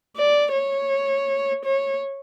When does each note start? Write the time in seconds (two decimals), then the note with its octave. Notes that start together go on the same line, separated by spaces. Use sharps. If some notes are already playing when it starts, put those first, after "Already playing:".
0.16 D5
0.53 C#5
1.65 C#5